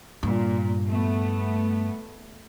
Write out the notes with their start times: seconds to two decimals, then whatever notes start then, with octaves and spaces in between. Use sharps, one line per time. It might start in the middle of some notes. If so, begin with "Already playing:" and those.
0.23 G2 A#2
0.87 A3 B3